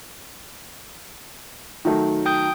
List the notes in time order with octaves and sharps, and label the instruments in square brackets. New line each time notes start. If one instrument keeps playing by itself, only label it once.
[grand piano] D#3 F#3 A3
[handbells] G5 D#6 G6